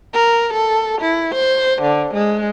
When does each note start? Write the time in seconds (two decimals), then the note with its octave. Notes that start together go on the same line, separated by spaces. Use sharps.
0.14 A#4
0.53 A4
1.01 E4
1.35 C5
1.82 D3
2.14 G#3